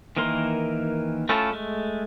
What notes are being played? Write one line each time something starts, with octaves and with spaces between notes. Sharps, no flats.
D#3 E3 A#3 A#4 C6
A3 C#4 E4 F4 A4
G#3 A3